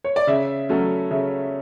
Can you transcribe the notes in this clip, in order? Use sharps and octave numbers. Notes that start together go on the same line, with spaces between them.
C#5
D5
C#3 E5
F#3 A3 C#4
C#3 E5